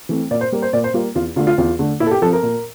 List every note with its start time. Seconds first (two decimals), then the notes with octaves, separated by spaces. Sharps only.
0.09 E3 A3 C4
0.31 A#2 D5
0.41 C5
0.52 G3 A#3
0.62 C5
0.73 A#2 D5
0.84 C5
0.94 G3 A#3 F4
1.15 E2 F4
1.36 D3 A3 F4
1.47 F4
1.58 E2 F4
1.79 D3 A3
2.00 A#2 E4
2.07 A4
2.11 G4
2.22 F3 C4 A4
2.33 A#4
2.43 A#2